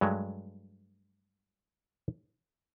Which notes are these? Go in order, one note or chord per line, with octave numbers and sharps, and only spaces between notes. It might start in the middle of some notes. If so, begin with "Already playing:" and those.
G2 F#3 G#3 A3